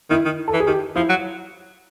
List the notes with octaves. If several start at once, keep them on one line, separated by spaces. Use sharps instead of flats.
D#3 E4
D#3
A4
E3
G#4
D#3 G4
F3 E4
F#3